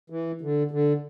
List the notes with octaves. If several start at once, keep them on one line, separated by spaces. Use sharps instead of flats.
E3
D3
D3